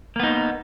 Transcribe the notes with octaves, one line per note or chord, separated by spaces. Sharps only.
A#3 B3 D#4